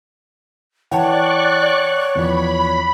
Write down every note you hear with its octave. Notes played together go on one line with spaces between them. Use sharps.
E3 C#5 D5 F#5 G5 A5 C#6 F#6
E2 F3 B5